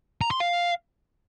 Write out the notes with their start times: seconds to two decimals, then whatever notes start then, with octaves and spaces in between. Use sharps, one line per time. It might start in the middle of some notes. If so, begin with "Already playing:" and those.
0.21 A#5
0.31 C6
0.40 F5